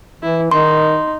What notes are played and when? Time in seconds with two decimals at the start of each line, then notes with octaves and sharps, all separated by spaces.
0.22 E3 E4
0.51 D#3 D#4 C6